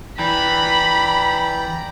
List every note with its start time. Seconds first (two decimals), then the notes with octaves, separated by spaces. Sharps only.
0.19 E3 D5 G5 A#5 B5